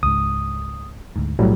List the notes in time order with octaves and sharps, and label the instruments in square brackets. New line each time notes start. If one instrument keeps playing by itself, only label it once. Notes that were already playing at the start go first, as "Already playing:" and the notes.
[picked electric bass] C#2 G#2 [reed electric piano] D#6
[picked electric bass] D2 G#2
[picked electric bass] B1 [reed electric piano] A2 F#3 G3